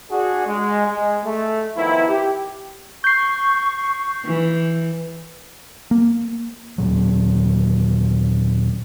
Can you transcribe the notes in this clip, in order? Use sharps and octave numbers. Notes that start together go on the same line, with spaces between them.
D4 F#4 G#4
G#3
G#3
A3
D#3 F3 B3 E4
G4
C#6 G6 C7
E3
A#3
D#2 A#2 F#3